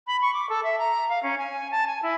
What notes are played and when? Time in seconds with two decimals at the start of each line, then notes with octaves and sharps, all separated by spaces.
0.07 B5
0.22 C#6
0.34 D6
0.50 A4
0.63 E5
0.79 A#5
1.09 F5
1.23 C#4
1.38 G#5
1.71 A5
1.87 G#5
2.03 E4